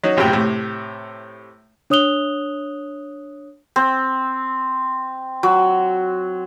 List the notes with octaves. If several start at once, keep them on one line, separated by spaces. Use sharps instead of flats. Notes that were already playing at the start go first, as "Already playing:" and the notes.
F#3 C#4 D#4
A#1 F#2 A2 C3 G5
A2 C3
D4 C#5 D#6 F#6 F7 G7
C4
F#3